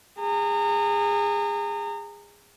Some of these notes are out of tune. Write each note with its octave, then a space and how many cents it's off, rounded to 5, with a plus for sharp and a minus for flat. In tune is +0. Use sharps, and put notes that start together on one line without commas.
G#4 -25 A#5 -35